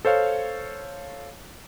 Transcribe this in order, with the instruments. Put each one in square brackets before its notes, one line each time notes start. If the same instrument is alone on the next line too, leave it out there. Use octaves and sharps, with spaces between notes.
[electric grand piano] A4 C5 C#5 F5